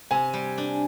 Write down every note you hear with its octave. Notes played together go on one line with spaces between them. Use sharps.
C3 G#5
G3
D4